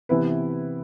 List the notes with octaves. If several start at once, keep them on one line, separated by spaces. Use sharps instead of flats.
C3 E3 B3 E4 B4